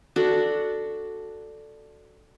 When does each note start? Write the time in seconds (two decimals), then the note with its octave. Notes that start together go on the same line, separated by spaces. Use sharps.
0.16 D4 F#4 A4